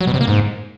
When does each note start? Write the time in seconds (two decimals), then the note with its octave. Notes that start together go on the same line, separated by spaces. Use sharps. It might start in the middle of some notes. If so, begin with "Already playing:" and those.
0.01 F#3
0.07 B2
0.14 C3
0.21 A#3
0.27 G#2